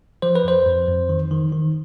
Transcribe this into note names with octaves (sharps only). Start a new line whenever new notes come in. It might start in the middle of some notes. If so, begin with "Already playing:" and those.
F3 C5
B4
F2 C5
F2
F2
D#3
D#3
D#3